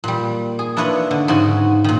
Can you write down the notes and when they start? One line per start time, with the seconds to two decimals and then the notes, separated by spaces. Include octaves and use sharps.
0.04 A#2 G3
0.59 G#4
0.77 D4 E4 F4 B4 C#5 D#5
1.11 D3
1.28 G#2 C#3 F#4 G#5
1.84 A#2 D#3